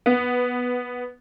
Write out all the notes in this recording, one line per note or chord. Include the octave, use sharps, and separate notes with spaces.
B3